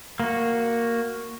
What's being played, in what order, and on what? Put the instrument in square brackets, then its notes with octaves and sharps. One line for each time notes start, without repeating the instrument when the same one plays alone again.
[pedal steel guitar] A#3 F#4